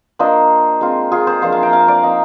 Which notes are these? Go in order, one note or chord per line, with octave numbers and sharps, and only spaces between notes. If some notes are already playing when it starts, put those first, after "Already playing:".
A#3 D4 F4 C5 D#5
G#3 C4 F4
F4 G#4
G#4 C5
F3 A#3 D4 F4 G#4 C5
F5 G#5
G5 A#5
F5 G#5
D5 F5
A#3 D#4 D#5 G5